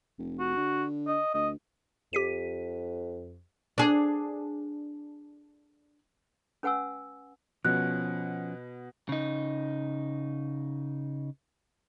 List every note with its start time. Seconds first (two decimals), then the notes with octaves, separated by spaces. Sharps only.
0.19 F1
0.39 F#4
0.57 D3
1.07 D#5
1.34 D2 D#5
2.13 F2 G4 B6 D#7
3.78 D4 G#4
6.63 C#4 B4 F#5 G#5 E6
7.65 B2 F3 C#4 F#6
9.09 C#3 D#4